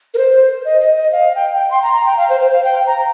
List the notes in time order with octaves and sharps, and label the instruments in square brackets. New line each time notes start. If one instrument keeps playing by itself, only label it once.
[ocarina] A#4
C5
D#5
D#5
D#5
F5
G5
G5
C6
A#5
A#5
G5
F5
C5
C5
F5
G5
A#5